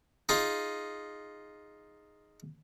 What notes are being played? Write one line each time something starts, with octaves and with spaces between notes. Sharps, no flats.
D#4 F4 G#4